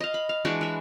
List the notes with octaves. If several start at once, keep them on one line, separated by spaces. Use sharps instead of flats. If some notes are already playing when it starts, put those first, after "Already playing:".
D#5 F5
B5
F5
E3 G#3 D4 F#4
E3 E5